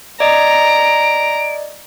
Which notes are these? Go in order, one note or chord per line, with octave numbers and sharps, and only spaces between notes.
D5 D#5 A#5 D7